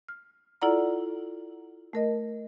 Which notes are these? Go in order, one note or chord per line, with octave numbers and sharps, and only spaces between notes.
F6
E4 F4 A4 D5 F#5 A#5
A3 A#4 D#5